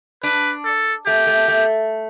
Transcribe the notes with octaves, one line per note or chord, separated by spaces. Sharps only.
D4 B4
A4
A3 G4
A3
A3